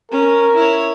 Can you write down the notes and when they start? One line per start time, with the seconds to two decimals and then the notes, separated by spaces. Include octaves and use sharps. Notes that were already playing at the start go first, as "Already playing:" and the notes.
0.12 C#4 A#4
0.56 E4 C#5